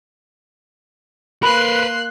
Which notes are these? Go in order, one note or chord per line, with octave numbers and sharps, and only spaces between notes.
A#3 A#4 B4 B5 C6 F#6